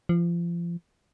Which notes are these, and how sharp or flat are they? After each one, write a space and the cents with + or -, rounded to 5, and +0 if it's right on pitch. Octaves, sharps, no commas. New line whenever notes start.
F3 -30